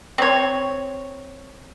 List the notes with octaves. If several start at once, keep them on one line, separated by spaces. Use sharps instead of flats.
C4 C#5